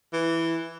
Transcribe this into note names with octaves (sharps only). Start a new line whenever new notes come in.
E3